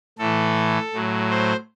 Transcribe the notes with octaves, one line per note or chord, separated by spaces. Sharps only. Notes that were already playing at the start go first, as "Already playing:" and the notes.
A2 E3 A4
A2 F#3
C5